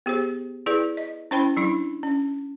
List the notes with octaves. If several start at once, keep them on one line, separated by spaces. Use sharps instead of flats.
B3 G4 G#4 C5
E4 G#4 B4 D5
D#5
C#4 E4 C5 G5 B5
F#3 D4 E4
C#4